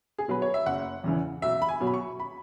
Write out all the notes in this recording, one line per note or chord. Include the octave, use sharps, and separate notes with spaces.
G#4
B2 F#3 B4
C#5
E5
F#1 F#5
E2 C#3 E3
B1 E5
B5
G#5
B2 F#3
B5
C#6
B5